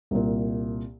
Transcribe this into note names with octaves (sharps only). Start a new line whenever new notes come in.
C2 A#2